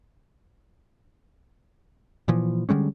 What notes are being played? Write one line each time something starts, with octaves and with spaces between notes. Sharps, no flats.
A#2 E3 F3
D3 G3 G#3 C#4